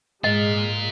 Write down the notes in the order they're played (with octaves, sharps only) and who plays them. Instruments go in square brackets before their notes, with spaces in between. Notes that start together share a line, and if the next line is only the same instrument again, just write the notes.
[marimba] G#2 [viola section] G#3 [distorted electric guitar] F4 A#4 [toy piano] D#5